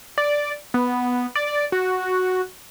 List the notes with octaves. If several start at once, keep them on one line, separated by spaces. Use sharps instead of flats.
D5
B3
D5
F#4